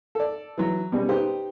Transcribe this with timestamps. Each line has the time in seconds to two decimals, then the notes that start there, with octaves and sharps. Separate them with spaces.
0.15 A4 D5
0.58 E3 F#3
0.92 B2 G3 C#4
1.09 D#4 G4 B4 C5